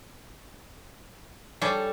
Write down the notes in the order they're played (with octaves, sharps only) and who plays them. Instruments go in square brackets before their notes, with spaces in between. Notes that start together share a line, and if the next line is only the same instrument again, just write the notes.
[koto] G3 A4 [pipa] D4 G#4 C#5